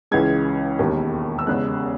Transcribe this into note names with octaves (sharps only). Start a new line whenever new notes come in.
C#2 C#3 E3 G#3 G#6
E1 D#2 D#3
E6
E2 C#3 G#3 F#6